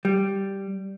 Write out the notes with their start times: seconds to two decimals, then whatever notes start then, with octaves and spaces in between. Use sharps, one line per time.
0.05 G3